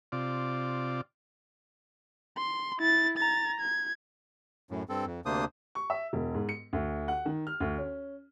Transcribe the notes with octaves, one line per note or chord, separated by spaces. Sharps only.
C3 F4 D5
C6
E4 A6
A#5 A6
G#6
F#2 A2
G2 C4 A4
F2
D2 C3 A#3 D4 C5 D#6
C#6
E5
E1
G#2
C#7
D2
F#5
D#3
F6
D2
C#4